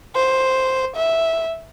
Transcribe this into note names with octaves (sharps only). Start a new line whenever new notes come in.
C5
E5